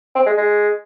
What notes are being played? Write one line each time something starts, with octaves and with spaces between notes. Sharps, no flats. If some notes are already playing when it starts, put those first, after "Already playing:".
C4
G#3
G#3